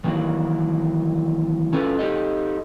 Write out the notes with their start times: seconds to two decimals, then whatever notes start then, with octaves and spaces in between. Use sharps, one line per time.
0.04 D#3 E3 F#3 A#3
1.73 C#4 F4 A4 B4
1.99 D#4 G4 A4 D#5